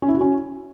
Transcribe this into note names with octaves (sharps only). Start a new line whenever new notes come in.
C#4
E4
F#4
C#4